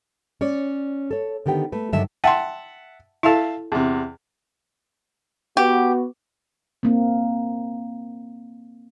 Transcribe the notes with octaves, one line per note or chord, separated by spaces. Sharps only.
C#4 C#5 D5
A4 C#5
D3 D#3 B3 G4 G5
A3 B4
G2 D3 D#3 F#3 E5 A5
E5 F#5 G5 A5 C6
E4 A4 E5 F5 A5
E2 C3
B3 F#4 G4
A#3 C4